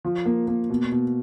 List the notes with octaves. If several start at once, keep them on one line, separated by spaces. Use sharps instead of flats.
F3
A#3
A#3
B2
B2